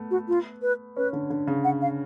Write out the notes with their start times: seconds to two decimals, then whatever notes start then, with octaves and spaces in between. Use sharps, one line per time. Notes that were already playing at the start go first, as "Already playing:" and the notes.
Already playing: A3 B3
0.11 F#4
0.28 F4
0.62 B4
0.96 C#4 B4
1.13 D3
1.30 D3
1.47 C#3
1.64 F#5
1.81 F5